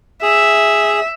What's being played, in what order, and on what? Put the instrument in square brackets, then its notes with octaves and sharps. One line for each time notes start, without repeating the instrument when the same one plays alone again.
[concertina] G#4 [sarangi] E5